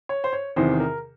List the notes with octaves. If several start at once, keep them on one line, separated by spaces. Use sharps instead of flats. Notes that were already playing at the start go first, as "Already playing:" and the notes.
C#5
C5
C#5
E2 C3 D#3 C5
A#4